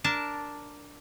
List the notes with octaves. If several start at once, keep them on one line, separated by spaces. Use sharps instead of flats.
D4 A#4 A5